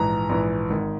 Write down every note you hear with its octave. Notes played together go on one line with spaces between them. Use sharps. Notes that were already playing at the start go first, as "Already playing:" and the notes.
Already playing: A#1 G#2 E3 A#5
A#1 G#2 E3
G#1 G#2 D#3